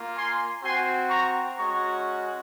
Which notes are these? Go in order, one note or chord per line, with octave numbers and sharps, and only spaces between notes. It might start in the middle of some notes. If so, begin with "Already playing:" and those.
Already playing: A#3 F4
G#5 C6
C4 F#4 G#5 C6
A#5 C#6
G#3 C#4 F#4 A#5 C#6